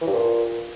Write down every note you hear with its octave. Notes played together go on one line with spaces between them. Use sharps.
E3
G2
A#2